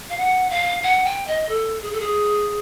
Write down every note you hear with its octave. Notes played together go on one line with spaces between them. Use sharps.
F5
F#5
F5
F#5
G5
D#5
A4
G#4
A4
G#4